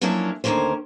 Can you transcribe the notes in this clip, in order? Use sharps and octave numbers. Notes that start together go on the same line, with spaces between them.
F3 F#3 A#3 C#4 D4 E4
D2 D#3 G3 A#3 C#4 C5